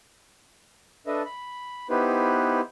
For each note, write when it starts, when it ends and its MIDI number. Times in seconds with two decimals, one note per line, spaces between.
1.07 1.23 62
1.07 1.23 69
1.07 1.23 71
1.07 1.23 75
1.07 1.23 76
1.25 1.87 83
1.90 2.61 59
1.90 2.61 63
1.90 2.61 64
1.90 2.61 67
1.90 2.61 71
1.90 2.61 72